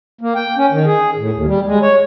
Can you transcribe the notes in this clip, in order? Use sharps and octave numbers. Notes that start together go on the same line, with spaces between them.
A#3
G5
C#4
D#3
G#4
A2
D#2
G3
G#3
C#5